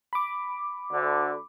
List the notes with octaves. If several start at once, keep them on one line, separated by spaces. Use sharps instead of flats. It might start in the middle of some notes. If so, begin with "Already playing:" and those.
B5 D6
D2 D3